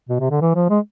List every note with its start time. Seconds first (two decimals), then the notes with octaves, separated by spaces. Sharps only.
0.09 B2
0.20 C3
0.31 D3
0.41 E3
0.55 F3
0.69 G#3